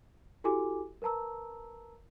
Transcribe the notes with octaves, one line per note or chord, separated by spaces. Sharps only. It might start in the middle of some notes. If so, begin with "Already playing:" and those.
E4 F#4 G4 A4 G#5 D6
A#4 B4 A5 A#5 E6